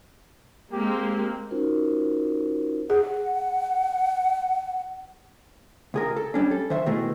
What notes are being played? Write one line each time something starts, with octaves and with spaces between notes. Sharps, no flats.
G#3 A#3 C4 G4
C#4 D#4 F4 F#4 A#4 C5
G#4 F#5
C#2 G#4 A#4
A4
G3 C#4 D4
A4
D#3 C5 E5
B2 D#3 E3 G#3 A3